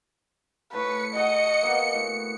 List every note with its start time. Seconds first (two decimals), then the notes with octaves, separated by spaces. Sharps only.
0.73 A2 B4 C#5 A5 C#7
1.15 F#4 G#4 D#5
1.63 A#3 B3 F#4
1.94 A2